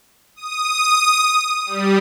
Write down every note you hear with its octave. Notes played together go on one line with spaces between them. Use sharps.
D#6
G3